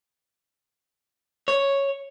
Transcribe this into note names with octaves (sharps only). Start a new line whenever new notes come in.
C#5